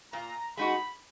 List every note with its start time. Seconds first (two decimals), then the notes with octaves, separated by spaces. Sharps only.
0.13 A#2 A#5
0.57 G#3 D#4 F#4 B5